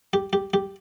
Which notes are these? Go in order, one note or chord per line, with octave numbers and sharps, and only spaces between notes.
G4
G4
G4